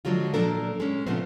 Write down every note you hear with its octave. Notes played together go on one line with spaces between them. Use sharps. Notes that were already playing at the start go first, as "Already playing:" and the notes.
D3 F3 F#3 G#3 F4
A#2 A#3 D4 A4 A#4
G#3 C#4
A#2 C#3 F3 A3 B3 C4